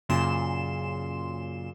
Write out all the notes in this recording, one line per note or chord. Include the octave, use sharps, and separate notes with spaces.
F#2 A#2 C#3 C6 E7